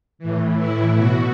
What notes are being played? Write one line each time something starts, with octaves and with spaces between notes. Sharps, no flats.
A2 E3
E4
B2 F#4